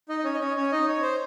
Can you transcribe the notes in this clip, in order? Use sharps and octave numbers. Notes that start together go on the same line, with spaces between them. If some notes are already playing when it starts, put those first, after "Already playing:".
D#4 D#5
D#5
C#4 C#5
D#5
C#4 C#5
C#4 C#5
D#4 D#5
C#5
C5